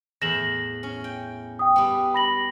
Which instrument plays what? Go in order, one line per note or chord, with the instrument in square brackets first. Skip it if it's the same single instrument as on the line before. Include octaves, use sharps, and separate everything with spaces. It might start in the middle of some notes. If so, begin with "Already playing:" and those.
[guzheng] E2 A2 [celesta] A#6 E7 F#7
[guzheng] C#4
G5
[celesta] G5 D#6
[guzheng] G3 B3
[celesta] B5 A#6 F#7